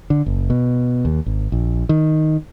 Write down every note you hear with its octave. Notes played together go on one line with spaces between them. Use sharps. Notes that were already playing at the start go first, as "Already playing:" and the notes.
D3
F#1
B2
D#2
G#1
A#1
D#3